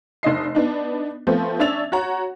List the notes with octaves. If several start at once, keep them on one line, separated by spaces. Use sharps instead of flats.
F1 D4 D#5 C7
B3 D4 D#4
F3 A3 B3 C4
C#4 D4 E5 E6 A6 F7
F#4 C#5 F#5 A#5